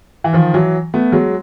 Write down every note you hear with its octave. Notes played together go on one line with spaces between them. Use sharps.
E3
D#3 F3
E3 F#3
A3 B3
F#3 G#3